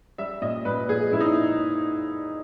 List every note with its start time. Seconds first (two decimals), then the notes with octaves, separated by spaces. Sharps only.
0.18 G3 E5
0.42 A#2 D#5
0.65 A#2 B4
0.89 A#2 G#4
1.12 A#2 E4
1.20 D#4